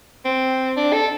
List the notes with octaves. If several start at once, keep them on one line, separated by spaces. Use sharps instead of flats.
C4
D4
A4